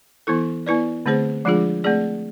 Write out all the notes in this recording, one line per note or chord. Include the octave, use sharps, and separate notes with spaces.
E3 B3 E4 A4
B3 E4 B4 D5
D3 A3 C4 G#4 C5
F3 G#3 D4 F4 G#4
A3 C4 G#4 D5